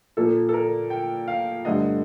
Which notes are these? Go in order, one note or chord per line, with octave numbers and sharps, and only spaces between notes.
A#2 F3 A#3 A4
A4
A#4
G5
F5
G2 D3 A3 D#5